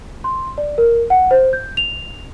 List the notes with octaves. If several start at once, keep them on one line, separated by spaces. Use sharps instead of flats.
C6
D5
A#4
F#5
C5
G6
F7